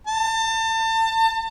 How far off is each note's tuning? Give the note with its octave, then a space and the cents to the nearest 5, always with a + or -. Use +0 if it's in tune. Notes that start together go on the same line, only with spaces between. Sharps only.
A5 +30